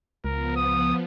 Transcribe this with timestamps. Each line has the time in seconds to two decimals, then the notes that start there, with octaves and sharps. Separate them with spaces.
0.24 C#2 F3 B3 A#4
0.56 D#6